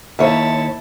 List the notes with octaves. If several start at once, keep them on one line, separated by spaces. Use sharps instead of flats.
D#2 E4 C#5 E5 A5